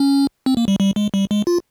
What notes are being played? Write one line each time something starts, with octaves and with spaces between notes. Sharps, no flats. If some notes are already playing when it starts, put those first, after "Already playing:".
Already playing: C#4
C4
A#3
G3
G3
G#3
G3
G#3
F4